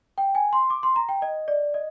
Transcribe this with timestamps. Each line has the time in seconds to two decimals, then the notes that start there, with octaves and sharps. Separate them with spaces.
0.18 G5
0.35 G#5
0.53 C6
0.70 D6
0.83 C6
0.96 A#5
1.09 G5
1.22 D#5
1.48 D5
1.74 D#5